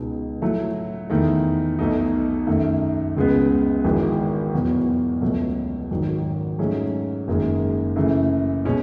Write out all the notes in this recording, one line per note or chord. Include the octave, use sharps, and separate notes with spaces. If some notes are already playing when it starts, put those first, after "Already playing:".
Already playing: C#2 B2 G#3 D#4 F#4
A2 F#3 A3 E4
E2 D#3 A3
B1 B2 A3 D#4
F#2 D#3 A3
C#2 C#3 G#3 B3
G#1 G#2 E3 G#3
E2 B2 F#3 B3 F#4
C#2 B2 F#3 A3
G#1 G#2 D#3 F#3
G#2 F#3 A3 C#4 G#4
F#1 F#2 D#3 G#3
F#2 C#3 E3 A3
B2 G#3 C#4